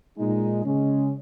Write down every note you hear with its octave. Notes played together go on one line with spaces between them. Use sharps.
A#2 G#3 D#4
C#3 G#3 C#4